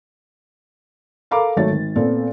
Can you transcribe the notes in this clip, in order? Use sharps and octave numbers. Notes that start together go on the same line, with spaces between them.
A4 A#4 F5 A#5 B5 D6
G#1 F#3 A3 C#5 A6
G#1
A#2 B3 C4 A4